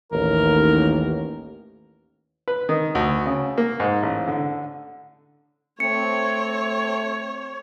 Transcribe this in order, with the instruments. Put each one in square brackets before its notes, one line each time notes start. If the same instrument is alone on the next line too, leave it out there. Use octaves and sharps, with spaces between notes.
[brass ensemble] A1 D#2 [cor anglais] A#4
[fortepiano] B4
D#3
D2
C#3
A#3
G#2
A1
D3
[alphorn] A3 [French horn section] C4 [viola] C#5 [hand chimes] C#7